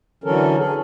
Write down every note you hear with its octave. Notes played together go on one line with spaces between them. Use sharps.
D3 E3 F#3 C#4 A4 A#4
G#4 A4